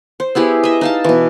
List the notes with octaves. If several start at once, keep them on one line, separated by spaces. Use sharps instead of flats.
C5
B3 E4 G4 G#4
D#5 E5
D#4 F5 A5
B2 E3